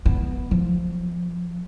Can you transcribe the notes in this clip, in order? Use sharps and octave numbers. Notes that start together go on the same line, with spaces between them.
B3
F3